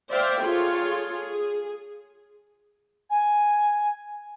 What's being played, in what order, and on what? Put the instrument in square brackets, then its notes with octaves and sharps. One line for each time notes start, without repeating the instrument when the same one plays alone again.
[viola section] C5 D5 E5 F5 G5
F4 G#4 A4 C#5
G#4
[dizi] G#5